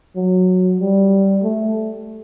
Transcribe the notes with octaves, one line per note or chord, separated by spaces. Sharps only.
F#3
G3
A3